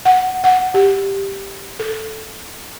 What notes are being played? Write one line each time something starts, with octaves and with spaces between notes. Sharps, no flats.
F#5
F#5
G4
A4